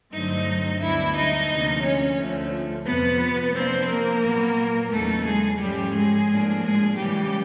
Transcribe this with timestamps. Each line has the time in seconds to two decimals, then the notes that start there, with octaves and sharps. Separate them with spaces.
0.12 G2 D3 F#3 A3 C4 D#4 D#5
0.80 D2 D3 G3 B3 D4 E4 E5
1.14 D#4 D#5
1.48 D2 C3 F3 A#3
1.83 C#4 C#5
2.17 D2 D3 F3 A3
2.85 F2 C3 F3 B3 B4
3.54 C3 F3 A#3 C4 D4 C5
3.88 A#3 A#4
4.22 A#2 F#3 B3
4.90 E2 C#3 F#3 A3 A#3 D#4 A4
5.25 G#3 G#4
5.59 G#2 F3 G3 A3 C#4 G4
5.94 G#3 G#4
6.28 A2 F3 A#3 D4
6.62 G#3 G#4
6.96 C#3 E3 G3 G#3 C#4 G4